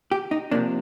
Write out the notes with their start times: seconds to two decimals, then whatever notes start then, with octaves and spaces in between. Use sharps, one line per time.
0.12 G4
0.31 D#4
0.51 C3 F3 A#3 D4